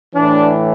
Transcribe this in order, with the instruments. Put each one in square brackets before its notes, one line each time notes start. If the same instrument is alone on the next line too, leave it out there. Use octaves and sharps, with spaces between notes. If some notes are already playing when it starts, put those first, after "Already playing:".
[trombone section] A2 E3 D4